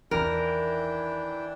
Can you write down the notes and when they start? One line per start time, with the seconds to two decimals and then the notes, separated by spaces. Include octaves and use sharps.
0.11 E2 D#3 E3 D4 E4 A#4 G5